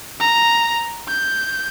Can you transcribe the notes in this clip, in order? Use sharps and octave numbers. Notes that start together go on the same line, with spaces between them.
A#5
G6